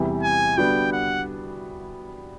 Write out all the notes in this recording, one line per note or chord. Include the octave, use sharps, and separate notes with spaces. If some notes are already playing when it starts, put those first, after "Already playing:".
Already playing: E2 C3 E3 G3
G#5
D3 G3 B3 D4 F#4 G5
F#5